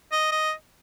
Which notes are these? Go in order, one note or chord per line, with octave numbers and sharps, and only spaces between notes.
D#5
D#5